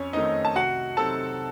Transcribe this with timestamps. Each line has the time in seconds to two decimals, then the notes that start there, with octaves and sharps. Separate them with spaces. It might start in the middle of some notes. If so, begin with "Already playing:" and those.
Already playing: F2 C#4 C#5
0.13 D#3 A3 C4 D#4 D#5
0.45 A5
0.56 C2 F#4 F#5
0.97 C3 F#3 C4 D#4 A4 A5